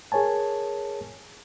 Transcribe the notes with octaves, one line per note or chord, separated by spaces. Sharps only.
G#4 A#4 C#5 G#5 A5